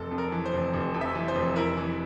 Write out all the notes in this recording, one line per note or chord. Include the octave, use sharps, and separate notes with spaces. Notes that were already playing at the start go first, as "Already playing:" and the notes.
Already playing: F1 A4
F2
A#4
E3
C5
F1
F1
F2
E5
E3
C5
F1
E4 A#4
E3